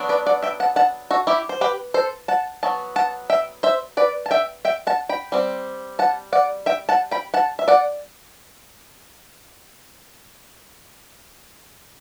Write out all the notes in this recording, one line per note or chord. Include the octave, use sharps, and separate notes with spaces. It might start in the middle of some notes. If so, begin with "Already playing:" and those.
Already playing: F#3 B3 D4
B4 D5
D5 F#5
E5 G5
F#5 A5
F#5 A5
F#4 A4
E4 G4
C5
G4 B4
A4 C5
F#5 A5
F#3 B3 A5
F#5 A5
E5 G5
C5 E5
B4 D5
A5
E5 G5
E5 G5
F#5 A5
G5 B5
G3 C4
F#5 A5
D5 F#5
E5 G5
F#5 A5
G5 B5
F#5 A5
E5
D5 F#5